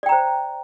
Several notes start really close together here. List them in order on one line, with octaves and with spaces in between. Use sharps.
D5 G5 A#5 C5